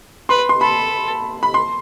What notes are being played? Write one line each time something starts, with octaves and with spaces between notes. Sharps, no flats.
B4 C6
C6
A4 B5
B5
C6